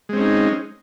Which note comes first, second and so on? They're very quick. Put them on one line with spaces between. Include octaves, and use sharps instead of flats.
G#3 C4 C#4 D#4